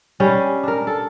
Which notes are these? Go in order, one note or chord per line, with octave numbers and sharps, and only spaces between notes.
G3 G#3 C#4 G4
D4 A#4
A4